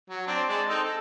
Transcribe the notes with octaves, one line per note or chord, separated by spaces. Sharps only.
F#3
C4 D4
G#3 D5 A5
C4 D#4 A4
A4